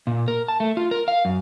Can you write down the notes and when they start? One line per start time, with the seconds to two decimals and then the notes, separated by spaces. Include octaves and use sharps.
0.07 A#2
0.28 A#4
0.48 A5
0.60 A3
0.77 F4
0.91 A#4
1.08 F5
1.25 F#2